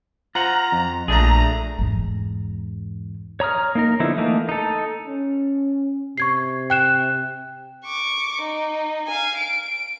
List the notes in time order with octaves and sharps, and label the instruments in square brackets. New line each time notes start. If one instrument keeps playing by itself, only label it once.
[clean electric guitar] F4 C5 F#5 [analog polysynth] A#5
[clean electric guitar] F2
[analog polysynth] A#1 A#5 [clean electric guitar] A3 D4 G#4
[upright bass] E2 G#2
[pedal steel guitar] C#5 A#5 D#6 F6
A#3 D#4 A#4
D3 F3 B3 D#4 E4
E3 A3 A#3 D#4
D#4 A4
[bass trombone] C#4
[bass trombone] C3 [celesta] C#6 G#6 C7
[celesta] G5 F#6 E7
[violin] C#6 D6
D#4
F5 G#5
D7